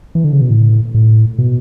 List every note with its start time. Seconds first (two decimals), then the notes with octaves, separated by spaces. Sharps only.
0.15 E3
0.24 D3
0.33 C#3
0.41 B2
0.50 A2
0.94 A2
1.38 B2